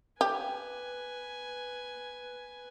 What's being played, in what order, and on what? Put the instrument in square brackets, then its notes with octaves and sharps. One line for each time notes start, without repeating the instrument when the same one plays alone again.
[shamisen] G4 [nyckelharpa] B4 G#5